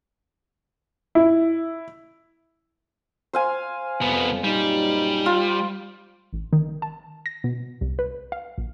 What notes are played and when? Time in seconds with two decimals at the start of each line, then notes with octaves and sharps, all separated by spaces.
1.15 E4
3.33 C5 F5 G#5
4.01 C2 F2 B3
4.44 F#2 A#2 G3 D#4
5.26 F4
6.33 A1
6.53 D#3
6.82 A5
7.26 A#6
7.44 B2
7.81 C2
7.99 B4
8.32 F5
8.58 A#1